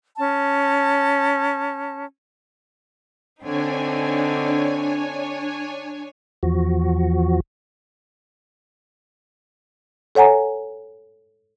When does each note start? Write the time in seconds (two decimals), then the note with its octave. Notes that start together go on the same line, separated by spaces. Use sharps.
0.17 C#4 A5
3.43 D3 C4 D4 D#4 C#5 G#5
6.43 E2 F3 F#4
10.15 A4 C#5 F#5 G#5 A#5